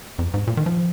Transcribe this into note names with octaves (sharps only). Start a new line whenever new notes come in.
F2
G#2
A#2
D#3
F3